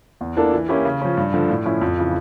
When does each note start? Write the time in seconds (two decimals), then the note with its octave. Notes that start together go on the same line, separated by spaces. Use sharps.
0.21 E2
0.37 E3 A#3 D4 A4
0.53 E3
0.69 A#3 C#4 E4 G4
0.85 C#3
1.01 F3 C#4
1.17 G2
1.34 D3 F3
1.49 A2
1.66 F3 C#4 E4
1.81 F2
1.98 C#3 E3